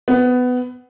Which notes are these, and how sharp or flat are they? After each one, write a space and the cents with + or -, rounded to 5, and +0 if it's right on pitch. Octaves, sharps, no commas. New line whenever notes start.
B3 +15